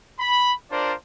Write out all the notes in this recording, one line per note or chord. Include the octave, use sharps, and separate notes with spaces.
B5
D4 F4 A#4 C5 D5